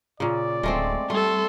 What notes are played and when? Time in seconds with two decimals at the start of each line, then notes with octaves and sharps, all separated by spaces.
0.20 A#2 C#3 D5
0.63 D1 G#3 A3 C4
1.10 G3 A3 A4 C6